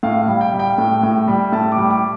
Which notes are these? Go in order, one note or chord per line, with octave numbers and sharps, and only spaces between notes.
A2 F5
F5
G3
G5
G3
G5
A2
A2
G3
A2 A5
D6
G3
D6